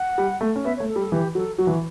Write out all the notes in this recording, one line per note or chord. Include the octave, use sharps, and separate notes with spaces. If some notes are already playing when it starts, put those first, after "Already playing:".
Already playing: F#5
G3
A3
C#4
B3 E5
C#5
A3
A4
G3
A4
E3 G4
F#3 A4
F#3 F#4
E3